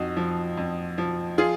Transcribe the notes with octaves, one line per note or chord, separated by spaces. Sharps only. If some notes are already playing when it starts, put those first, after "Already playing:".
Already playing: F2 D#4 F#4
F3
F2
F3
F4 G#4